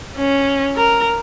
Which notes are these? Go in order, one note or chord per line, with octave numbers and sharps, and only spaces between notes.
C#4
A#4